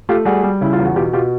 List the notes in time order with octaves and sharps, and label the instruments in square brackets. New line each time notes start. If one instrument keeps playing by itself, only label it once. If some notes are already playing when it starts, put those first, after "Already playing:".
[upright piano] A3 F4 G4
G3 F#4 G#4
G3
C#3 E4
F4
E2
F#4
B2 F4 G4
B2 F4 G4